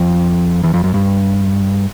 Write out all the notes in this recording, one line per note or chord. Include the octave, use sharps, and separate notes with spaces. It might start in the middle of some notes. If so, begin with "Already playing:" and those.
Already playing: F2
E2
F2
F#2
G2